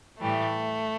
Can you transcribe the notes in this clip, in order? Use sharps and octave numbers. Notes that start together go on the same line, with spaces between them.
A2 E3 G3 A3